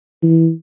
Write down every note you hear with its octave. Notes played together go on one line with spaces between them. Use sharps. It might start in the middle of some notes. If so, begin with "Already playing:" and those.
E3